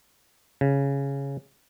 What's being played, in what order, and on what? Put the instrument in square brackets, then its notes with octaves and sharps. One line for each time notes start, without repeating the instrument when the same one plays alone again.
[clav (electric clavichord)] C#3